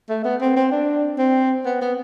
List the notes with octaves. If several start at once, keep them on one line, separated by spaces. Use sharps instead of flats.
A3
B3
C4
C4
D4
C4
B3
B3